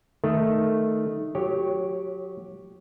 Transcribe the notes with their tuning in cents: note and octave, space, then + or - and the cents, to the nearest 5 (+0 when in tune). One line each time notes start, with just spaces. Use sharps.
D#3 +0 A3 +0
F#3 -25 G4 +0 C#5 +0